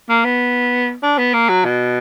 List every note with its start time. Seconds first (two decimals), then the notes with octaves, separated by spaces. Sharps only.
0.09 A#3
0.25 B3
1.03 D4
1.18 B3
1.34 A#3
1.49 F#3
1.65 B2